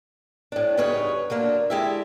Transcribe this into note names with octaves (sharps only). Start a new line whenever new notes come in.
A2 D4
D2 G2 C#3 D#4 B4 C#5
D3 F#3 A#3 D4
G#3 E4 G4 A4 E5